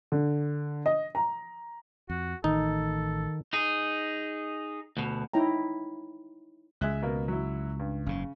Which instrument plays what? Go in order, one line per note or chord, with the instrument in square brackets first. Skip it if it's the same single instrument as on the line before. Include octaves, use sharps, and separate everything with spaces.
[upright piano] D3
D#5
A#5
[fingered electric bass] F2 [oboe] F#4
[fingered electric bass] A1 [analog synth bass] D#3 [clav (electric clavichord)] D#4 [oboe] A4
[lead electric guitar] D#4 G#4
D2 B2
[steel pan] D#4 E4 C#5 G5 A#5
[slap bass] C#2 [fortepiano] G#3 E5 F#6
[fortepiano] B2 A#3
F#3 E4
G2
[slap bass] F#1 G#2 [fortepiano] C#3